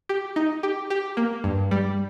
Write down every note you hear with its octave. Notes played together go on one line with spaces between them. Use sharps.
G4
D#4
G4
G4
A#3
G2
G3